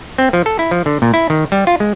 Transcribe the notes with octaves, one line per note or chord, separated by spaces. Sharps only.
C4
F3
A4
E4
F3
D3
A#2
E4
D#3
G3
F4
G#3